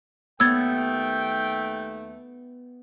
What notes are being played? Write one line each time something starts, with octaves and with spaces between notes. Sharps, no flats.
D#2 A3 B3 G5 E6 G#6 A6